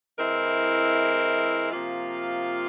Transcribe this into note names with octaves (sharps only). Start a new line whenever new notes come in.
E3 G#3 C4 E4 A#4
C3 F3 A#3 F4